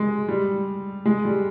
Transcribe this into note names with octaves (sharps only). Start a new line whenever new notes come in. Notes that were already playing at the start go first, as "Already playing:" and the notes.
Already playing: G#3
G3
G#3
G3